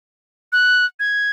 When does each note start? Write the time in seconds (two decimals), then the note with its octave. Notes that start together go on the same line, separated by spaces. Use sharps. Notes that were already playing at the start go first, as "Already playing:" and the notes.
0.53 F#6
1.00 G#6